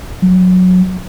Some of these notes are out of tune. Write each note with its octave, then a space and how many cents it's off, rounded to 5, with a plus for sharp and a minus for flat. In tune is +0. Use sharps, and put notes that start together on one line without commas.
F#3 -15